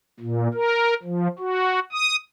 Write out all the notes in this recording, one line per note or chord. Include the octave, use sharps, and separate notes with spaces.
A#2
A#4
F3
F#4
D#6